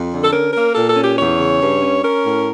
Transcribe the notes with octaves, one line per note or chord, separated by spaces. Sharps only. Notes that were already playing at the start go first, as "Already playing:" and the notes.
Already playing: F2
D3
A4
C#4 A#4
A#3 A#4
A#2 A4
A4
C#4
G4
E2 C#5
C#3
G2
C#4
C#4 A#4
A2